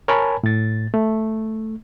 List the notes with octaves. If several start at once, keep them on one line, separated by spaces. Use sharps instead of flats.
A#4 C#5 G#5 A5 B5
A2 A6
A3